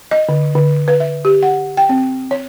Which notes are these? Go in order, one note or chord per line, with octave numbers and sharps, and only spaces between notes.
D#5
D3
D3
B4
E5
G4
F#5
G5
C4
C#5